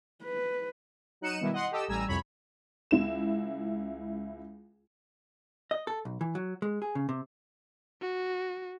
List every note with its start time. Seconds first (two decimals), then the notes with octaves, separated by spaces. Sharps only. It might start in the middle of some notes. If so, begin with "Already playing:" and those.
0.24 B4
1.21 F#3 D#4 F#6 C#7 D#7 E7
1.40 B2 D#3 G3 E4
1.53 D#5 F#5 C6
1.71 G4 A4 D#5 E6
1.88 A1 G3 G#5 A#5 E6
2.08 C2 F2 C#5 B5
2.91 C#2 E4 E7
5.71 D#5
5.87 A4
6.05 B1
6.21 E3
6.35 F#3
6.62 G#3
6.82 G#4
6.95 C#3
7.09 C3
8.02 F#4